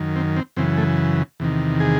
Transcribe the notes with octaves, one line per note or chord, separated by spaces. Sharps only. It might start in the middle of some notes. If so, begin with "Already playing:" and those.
Already playing: F#2 D#3
C4
C4
F#2 C#3 E3 C4
A3
E2 C3 D#3
G#4